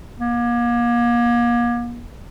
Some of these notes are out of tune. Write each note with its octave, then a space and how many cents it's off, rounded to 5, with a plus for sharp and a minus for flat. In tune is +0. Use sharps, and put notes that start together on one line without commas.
A#3 +35